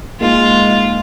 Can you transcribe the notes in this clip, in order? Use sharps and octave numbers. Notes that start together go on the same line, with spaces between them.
G#3 A#3 D#4 F4